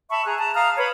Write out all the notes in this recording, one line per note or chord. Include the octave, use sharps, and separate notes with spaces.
E5 A5 B5 C#6
G#4 A#5 F#6
A5 A#5
F5 A#5 D#6 F6
B4 C#5 B5